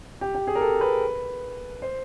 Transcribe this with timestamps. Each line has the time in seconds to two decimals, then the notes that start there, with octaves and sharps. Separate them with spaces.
0.21 G4
0.35 G4
0.47 G#4
0.55 A#4
0.61 A4
0.81 B4
1.82 C5